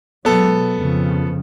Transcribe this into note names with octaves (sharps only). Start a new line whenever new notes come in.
B2 F#3 G#3 B3 A4
F2 C#3 F3